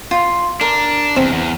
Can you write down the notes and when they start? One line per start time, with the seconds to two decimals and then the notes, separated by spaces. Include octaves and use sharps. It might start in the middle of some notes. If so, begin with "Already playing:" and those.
0.11 F4
0.61 D4 A#4
1.17 E2 C4
1.33 E2